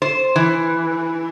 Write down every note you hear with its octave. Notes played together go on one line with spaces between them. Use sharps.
C5
E3